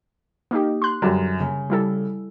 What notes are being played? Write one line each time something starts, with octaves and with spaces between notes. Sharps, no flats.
A#3 D#4 G4
C6 F#6
F#2 D3 G3
C#3
G3 E4 A4